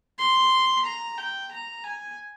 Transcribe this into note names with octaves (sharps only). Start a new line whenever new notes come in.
C6
A#5
G5
A#5
G#5